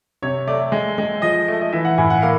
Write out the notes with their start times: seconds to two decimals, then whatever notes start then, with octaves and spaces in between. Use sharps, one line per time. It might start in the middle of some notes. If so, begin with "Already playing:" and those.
0.22 C3 C#5
0.47 A3 D5
0.72 G#3
0.98 G#3
1.22 F3 D#5
1.48 A3
1.61 D#5
1.73 E3 E5
1.85 F#5
1.98 A2 G#5
2.10 F#5
2.22 A#3 F5